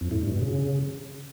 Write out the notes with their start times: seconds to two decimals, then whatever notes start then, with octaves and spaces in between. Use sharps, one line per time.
0.01 F2
0.11 A2
0.21 G2
0.32 B2
0.42 C#3